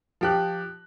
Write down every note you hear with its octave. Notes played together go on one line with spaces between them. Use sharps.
F3 G4 F#6